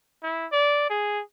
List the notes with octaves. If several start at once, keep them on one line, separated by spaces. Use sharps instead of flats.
E4
D5
G#4